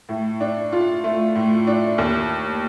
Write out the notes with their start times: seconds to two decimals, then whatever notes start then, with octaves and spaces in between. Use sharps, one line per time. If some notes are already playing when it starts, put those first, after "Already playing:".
0.09 A2
0.41 D4
0.72 F4
1.04 A3
1.35 A2
1.67 D4
1.98 D#2